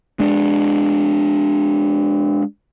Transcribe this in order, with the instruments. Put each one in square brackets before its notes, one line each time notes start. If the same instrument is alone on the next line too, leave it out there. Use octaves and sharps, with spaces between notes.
[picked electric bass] G#3 D4